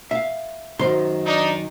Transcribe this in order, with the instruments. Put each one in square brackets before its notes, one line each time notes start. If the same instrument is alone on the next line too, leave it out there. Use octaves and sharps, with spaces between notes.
[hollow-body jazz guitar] E5 F5
[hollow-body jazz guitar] F#2 C5 C6 [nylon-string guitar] D#3
[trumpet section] D4 D#4